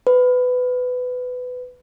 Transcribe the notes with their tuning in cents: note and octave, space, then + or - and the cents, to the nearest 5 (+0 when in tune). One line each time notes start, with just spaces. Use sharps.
B4 +20